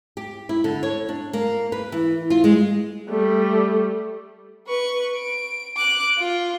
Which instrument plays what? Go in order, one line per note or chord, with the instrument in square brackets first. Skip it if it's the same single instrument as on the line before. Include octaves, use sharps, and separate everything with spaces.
[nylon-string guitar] G4
E4
D3
C#5
D4
A#3
B4
E3
F4
G#3
[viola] G3 A3
[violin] B4 C#6
D7
D6 F#6
F4